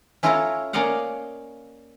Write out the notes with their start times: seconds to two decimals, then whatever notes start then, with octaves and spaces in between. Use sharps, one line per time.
0.23 C#4 E4 F4 A4 C#5 A#5
0.73 A#3 C#4 D5 D#5 F5 F#5